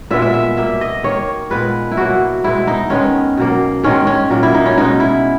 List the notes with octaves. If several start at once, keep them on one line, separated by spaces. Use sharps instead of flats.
A#2 G#3 B3 E5
E5
E5
B2 A#3 E5
D#5
D#3 A#3 C#5
A#2 G#3 B3 B4
E4
B2 F#3 A#3 F#4
B2 G#3 B3 E4
D#4
D#3 G#3 B3 C#4
B2 F#3 A#3
G#2 D#3 G#3 C#4
C#4
A#2 F#3 A#3
E4
D#4
C#4
B2 G#3 B3 D#4
E4